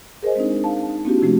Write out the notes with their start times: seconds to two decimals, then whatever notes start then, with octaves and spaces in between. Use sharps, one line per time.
0.23 G#4 A#4 C5 D#5 G#5
0.36 G#3 C4 D4 D#4
0.64 F5 A5
0.89 D#4
1.05 A#3 C4 D4 E4 F#4 G4
1.22 C3 F3 A3 C#4 F#4 G4